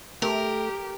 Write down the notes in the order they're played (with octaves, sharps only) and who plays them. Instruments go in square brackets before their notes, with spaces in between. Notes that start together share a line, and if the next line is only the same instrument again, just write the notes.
[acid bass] A3 [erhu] G4 [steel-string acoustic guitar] A#4